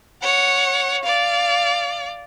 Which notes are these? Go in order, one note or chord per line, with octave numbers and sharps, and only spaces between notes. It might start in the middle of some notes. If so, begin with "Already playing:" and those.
C#5 F#5
D5 F5